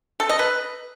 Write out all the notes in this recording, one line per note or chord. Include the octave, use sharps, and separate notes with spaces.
A4
D#5
B4